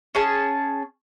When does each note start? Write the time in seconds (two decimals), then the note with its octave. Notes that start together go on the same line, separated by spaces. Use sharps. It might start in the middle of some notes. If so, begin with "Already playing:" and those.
0.15 C#4 G#4 A5